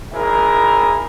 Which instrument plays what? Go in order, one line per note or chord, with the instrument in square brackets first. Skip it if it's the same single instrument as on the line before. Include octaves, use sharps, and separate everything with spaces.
[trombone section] G#1 E4 G#4 A#4